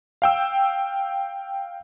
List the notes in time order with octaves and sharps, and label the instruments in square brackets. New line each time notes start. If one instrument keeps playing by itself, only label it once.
[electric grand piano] F5 G5 E6